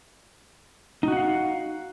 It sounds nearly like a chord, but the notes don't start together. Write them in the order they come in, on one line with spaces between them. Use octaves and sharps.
D#4 F#4 F#5 F5